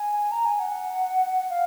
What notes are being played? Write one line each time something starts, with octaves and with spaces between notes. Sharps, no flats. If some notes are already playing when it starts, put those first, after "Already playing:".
Already playing: G#5
A#5
G#5
F#5
F5